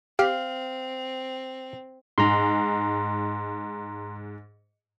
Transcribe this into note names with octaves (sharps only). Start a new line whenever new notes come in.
C4 G4 F5
G#2 A#5 C6